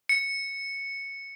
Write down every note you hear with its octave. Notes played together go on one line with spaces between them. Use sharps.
C#7